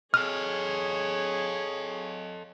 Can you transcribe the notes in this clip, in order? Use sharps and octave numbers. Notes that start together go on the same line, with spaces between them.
G#4 A4 C#5 D#5 F6